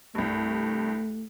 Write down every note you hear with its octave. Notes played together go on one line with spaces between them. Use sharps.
C2 G2 A3